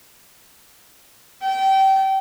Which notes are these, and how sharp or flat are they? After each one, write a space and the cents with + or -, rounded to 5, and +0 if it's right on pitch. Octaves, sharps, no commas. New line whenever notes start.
G5 -25